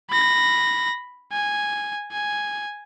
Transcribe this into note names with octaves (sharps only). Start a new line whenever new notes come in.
B5 A#6
G#5
G#5